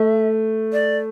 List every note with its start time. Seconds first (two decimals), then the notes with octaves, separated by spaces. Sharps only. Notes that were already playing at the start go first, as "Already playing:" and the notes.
Already playing: A3 E5
0.73 D5